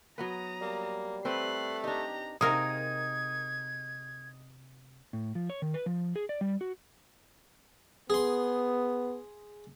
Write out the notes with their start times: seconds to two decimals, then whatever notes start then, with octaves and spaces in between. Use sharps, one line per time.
0.18 F#3 B3 B4 A#5 D#6
0.61 G3 A#3
1.25 A3 C4 B4 F#6 C7
1.84 D4 D#4 G4 A#5
2.41 C3 G#3 A#3 D#4 A#4 D#6 G#6
5.13 A2
5.35 F3
5.50 C#5
5.62 D#3
5.74 B4
5.86 F3
6.16 G#4
6.29 D5
6.41 G3
6.61 F#4
8.10 B3 G#4 C6